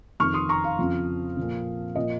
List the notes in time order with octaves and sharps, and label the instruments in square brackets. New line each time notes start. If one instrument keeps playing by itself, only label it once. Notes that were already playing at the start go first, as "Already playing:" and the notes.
[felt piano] F2 C3 D#3 C#6 F6
C6 D#6
A#5 C#6
F5
F2 C#3 F3
A#2 F3
A#2 F3 D#5